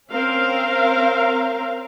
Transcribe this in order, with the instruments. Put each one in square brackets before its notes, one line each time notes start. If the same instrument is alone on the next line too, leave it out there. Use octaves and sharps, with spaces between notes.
[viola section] C4 C#4 A#4 F5